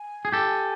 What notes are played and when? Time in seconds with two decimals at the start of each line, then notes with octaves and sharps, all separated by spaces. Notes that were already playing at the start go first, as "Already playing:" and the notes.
Already playing: G#5
0.25 G#4
0.32 G4 A4